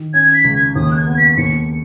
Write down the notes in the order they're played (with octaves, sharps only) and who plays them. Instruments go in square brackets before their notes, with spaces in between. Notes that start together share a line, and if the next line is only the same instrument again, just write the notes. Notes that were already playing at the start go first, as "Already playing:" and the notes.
Already playing: [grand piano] D#3
[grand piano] C#4 [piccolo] G#6
[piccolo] B6
[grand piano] C#2
[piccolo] G#6
[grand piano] D#2 [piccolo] D#6
[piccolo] F#6
G#6
[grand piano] B3
[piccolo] B6
B6
[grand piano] D#2 [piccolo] C#7